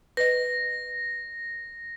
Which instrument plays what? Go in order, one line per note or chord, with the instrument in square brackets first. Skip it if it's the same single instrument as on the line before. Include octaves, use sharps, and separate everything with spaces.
[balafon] B4 D#5 [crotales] A#6